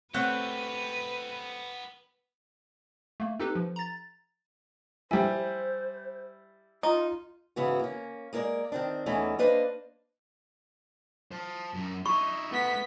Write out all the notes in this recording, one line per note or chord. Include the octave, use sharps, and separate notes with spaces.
A3 B3 C4 G4 B4 C#5 F#5
A3 A#3
C4 D#4 G4 A4 B4
F3
A#5 A6
G3 E4 C5 G5 G#5
D#4 F4
G#2 C#3 E3 B3 F#4
A#3 C#4
G#3 A#3 A#4 C#5 D5
D#3 C4 D4
E2 E3 A3 C#4 D#4
A#3 D4 B4 C5 D#5
C5 A5
F#2
D#4 E4 C#6
A3 B3 F#5 B6